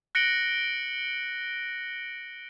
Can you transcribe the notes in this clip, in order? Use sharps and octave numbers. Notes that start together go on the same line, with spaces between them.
F#6 A#6 C#7 D7 F#7 G7